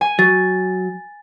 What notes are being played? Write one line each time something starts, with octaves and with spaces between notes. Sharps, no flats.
G#5
F#3 A6